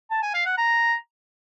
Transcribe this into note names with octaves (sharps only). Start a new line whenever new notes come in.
A5
G#5
F5
F#5
A#5